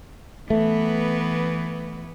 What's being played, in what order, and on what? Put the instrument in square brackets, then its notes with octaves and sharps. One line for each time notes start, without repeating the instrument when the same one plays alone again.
[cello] E3 B3 [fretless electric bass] A3